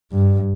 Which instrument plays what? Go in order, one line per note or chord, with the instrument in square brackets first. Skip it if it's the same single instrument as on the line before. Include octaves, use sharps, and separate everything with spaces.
[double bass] G2